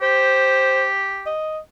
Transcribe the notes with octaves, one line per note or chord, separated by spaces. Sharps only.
G4 C5
D#5